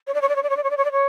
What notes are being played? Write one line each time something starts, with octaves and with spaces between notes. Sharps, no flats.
C#5
D5
C#5
D5
C#5
D5
C#5
D5
C#5
D5
C#5
D5
C#5